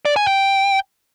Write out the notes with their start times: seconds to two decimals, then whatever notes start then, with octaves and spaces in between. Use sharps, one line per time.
0.05 D5
0.16 G#5
0.27 G5